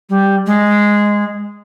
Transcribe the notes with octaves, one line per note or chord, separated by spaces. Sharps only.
G3
G#3